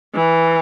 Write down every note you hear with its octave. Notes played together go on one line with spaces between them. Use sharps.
E3